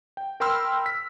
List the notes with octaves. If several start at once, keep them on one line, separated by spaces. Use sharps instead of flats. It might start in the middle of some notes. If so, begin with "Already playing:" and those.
G5
A#4 G5 B5 C6 E6 F6
B6